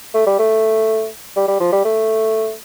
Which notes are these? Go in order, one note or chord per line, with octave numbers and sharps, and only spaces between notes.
A3
G3
A3
G3
G3
F3
G3
A3